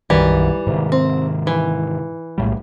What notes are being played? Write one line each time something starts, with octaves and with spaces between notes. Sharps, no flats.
B1 F#2 D#3 E3 G3
G#2 C3 D#3
C4
E3
B1 A2 G3